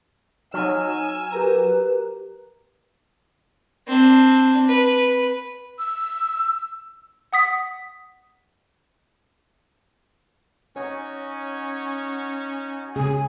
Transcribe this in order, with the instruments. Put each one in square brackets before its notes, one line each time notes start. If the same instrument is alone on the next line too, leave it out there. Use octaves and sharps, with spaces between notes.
[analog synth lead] F#3 [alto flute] D#4 [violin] G#5 E6 [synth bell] F6
[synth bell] G4 A#4 A#5 [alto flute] B4
[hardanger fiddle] C4 D4
B4
[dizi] E6
[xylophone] F#5 D#6 B6
[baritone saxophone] C#4 [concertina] D#4 F#4 G#5 [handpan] C#5
[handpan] C#3 C#4 G#4 [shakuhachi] G#5